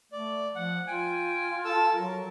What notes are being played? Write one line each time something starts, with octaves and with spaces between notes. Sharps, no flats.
A3 D5
F3 F#5
F4 G5 G#5
A4 A5 E6
F#3 A#4